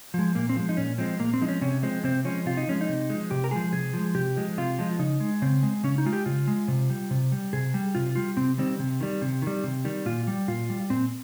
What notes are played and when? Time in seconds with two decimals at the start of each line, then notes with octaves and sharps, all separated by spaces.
0.14 F3 G#3
0.35 A#2 A#3
0.49 C4
0.56 F3 G#3
0.69 D#4
0.77 A#2 C#4
0.98 F3 G#3 C4
1.19 A#2 A#3
1.33 C4
1.41 F3 G#3 D#4
1.48 C#4
1.61 C3 C#4
1.83 F3 G#3 C4
2.04 C3 C4
2.25 F3 G#3 C#4
2.46 C3 F4
2.57 D#4
2.68 F3 G#3 C#4
2.81 D#4
2.89 C3
3.10 F3 G#3
3.31 C3 G4
3.44 A#4
3.51 F3 G#3 G#4
3.72 C3 G#4
3.93 F3 G#3
4.15 C3 G4
4.36 F3 G#3
4.58 C3 F4
4.79 F3 G#3
4.99 C#3 D#4
5.20 G#3
5.42 C#3 C4
5.63 G#3
5.84 C#3 C#4
5.98 D#4
6.06 G#3 F4
6.13 G4
6.26 C#3 F4
6.48 G#3
6.68 C3
6.90 G3
7.11 C3
7.32 G3
7.53 C3 G#4
7.74 G3
7.95 C3 F4
8.16 G3 F4
8.37 C3 C4
8.58 D#3 G3 C4
8.79 C3
9.01 D#3 G3
9.22 C3
9.42 D#3 G3
9.64 C3
9.85 D#3 G3
10.06 A#2 F4
10.28 G3
10.48 A#2 F4
10.70 G3
10.90 A#2 C4